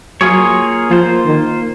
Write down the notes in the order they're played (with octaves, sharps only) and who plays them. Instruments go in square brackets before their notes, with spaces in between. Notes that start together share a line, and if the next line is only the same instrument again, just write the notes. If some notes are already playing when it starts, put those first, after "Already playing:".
[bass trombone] F#3 [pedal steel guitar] A#3 F4 G#4 C#5
[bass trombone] F3 [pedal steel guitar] A#3 F4 C5
[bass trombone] D#3